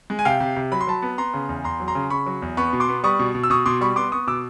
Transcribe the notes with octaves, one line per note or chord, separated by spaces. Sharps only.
G#3
G#5
C3 F5 G5
C3
C3
F#3 B5
C6
F#3 A5 B5
B3
B3 A#5 C6
C#3
E2
E2 A#5 C6
F#3
A#5 C6
C#3
C#3 B5 C#6
F#3
E2
B3 B5 C#6
B2
C6 D6
B3
G3 C#6 D#6
B2
B2
E6
B2 C#6 D#6
B2 C6 D6
G3 B5 C#6
B3 C6 D6
B3 C#6 D#6
B2 D6 E6